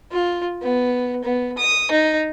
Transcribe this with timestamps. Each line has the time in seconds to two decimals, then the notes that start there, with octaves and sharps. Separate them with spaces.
0.12 F4
0.62 B3
1.24 B3
1.58 D#6
1.91 D#4